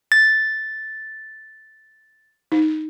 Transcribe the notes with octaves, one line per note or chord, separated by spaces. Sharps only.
A6
D#4